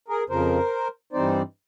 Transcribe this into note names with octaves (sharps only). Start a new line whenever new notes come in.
G#4 A#4
F2 C#3 F3 A#4 C5
G2 E3 G3 C4 D#4 C5 D5